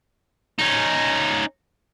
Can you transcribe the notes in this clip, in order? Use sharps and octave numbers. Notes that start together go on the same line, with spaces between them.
C#4 D#4